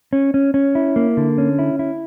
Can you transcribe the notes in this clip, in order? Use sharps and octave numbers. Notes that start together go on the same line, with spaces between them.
C#4
C#4
C#4
E4
A#3
D3
C#4
E4
E4